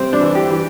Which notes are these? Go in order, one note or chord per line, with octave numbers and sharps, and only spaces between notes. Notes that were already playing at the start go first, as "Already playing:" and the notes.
Already playing: C3 C4
D4
E3
G4
E3